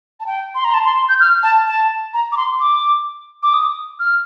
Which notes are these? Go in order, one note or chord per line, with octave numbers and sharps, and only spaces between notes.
A5
G5
C6
A#5
A5
C6
G6
F6
A5
A5
A#5
D6
C6
D6
D6
D#6
F6